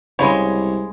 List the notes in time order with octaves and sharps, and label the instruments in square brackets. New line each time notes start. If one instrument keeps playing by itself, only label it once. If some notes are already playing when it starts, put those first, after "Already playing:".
[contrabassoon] C2 [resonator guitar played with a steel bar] C#3 G#3 [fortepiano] C#5